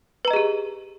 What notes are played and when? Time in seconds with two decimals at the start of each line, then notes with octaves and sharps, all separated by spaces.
0.25 B4
0.28 A#5
0.30 D#5
0.33 G#4
0.36 G4